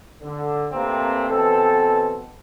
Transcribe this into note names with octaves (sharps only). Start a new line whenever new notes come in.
D3
A#1 C3 A3 A#3 C4 B4
B2 E3 C4 A4